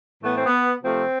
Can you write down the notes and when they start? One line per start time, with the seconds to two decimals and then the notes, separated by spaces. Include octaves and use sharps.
0.23 A2 E3 A3 B3
0.34 C4
0.46 B3
0.83 C3 F3 A3 C4